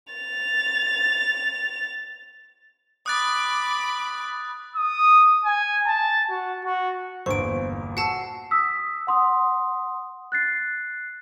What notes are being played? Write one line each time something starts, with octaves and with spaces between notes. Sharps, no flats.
A6 F7
B5 D6 D#6 F#6 A6
D#6
G#5
A5
F#4
F#4
G1 E2 A#2 C5 C#6 D7
F#4 F#5 A5 E6 C7
D#6 E6 B6
F#5 C6 D#6
F#6 A6 C7